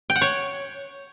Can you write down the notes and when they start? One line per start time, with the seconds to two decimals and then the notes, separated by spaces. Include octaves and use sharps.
0.10 G5
0.16 F#5
0.21 C#5